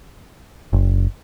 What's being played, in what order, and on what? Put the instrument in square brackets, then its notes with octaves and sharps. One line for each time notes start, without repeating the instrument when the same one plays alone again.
[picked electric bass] F#1